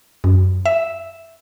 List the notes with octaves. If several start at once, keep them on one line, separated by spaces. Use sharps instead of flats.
F#2
E5